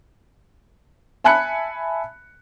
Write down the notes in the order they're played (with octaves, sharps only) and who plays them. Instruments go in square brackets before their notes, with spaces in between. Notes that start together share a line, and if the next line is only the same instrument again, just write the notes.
[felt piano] E5 G#5 A5 B5 F#6 C#7